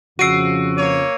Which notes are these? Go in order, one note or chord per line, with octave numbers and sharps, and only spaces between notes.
F2 C#3 F3 F#4 E6 C7 D7 D#7
A#3 C#5 D#7